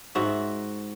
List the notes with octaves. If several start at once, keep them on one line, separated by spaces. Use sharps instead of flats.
G#2 F#4 E5